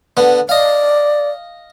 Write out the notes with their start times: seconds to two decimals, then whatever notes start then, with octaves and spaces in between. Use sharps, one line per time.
0.17 D3 B3
0.49 D5 D#5 F5